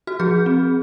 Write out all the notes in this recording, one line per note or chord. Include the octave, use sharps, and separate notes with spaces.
F#4
F3 G#4
C4